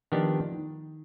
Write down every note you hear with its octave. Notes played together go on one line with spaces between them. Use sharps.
D#3 F3 B3 D4 G4
D#3